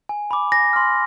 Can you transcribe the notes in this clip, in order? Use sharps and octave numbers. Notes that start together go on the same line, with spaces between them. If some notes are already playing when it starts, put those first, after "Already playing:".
G#5
B5 D6
G#5 A#6
C6 F6